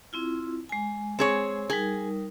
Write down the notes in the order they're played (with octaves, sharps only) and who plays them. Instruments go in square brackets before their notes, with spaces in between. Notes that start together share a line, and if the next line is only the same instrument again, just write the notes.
[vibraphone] C4 E4 F4
G#3 G#5
[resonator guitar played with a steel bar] C4 G#4 C#5
[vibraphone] G3 D#4 A#4 [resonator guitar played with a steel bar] G#4